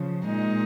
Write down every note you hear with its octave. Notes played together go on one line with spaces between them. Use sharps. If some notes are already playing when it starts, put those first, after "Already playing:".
Already playing: C#3 F3
A#2 G#3 D#4